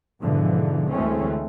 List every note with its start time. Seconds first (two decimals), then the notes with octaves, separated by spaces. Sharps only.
0.23 G#2 B2 D3 E3 F3
0.92 D2 E3 G#3 A3 C4 C#4